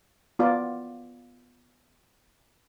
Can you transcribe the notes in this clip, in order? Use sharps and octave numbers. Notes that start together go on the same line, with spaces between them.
B3 F4 D5